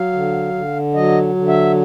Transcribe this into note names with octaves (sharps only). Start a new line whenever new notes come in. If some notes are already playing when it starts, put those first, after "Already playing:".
Already playing: F#3 F5
D3
D3
F#3 D#5
D3
E5